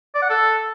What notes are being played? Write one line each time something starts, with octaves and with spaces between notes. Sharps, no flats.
D5
F#5
A4